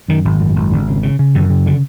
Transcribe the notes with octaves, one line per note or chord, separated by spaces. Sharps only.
F#2 D#3
G#1
F#2
G#1
G#1 D3
C#3
C#3
C#3
F#2 D#3
C#3
D3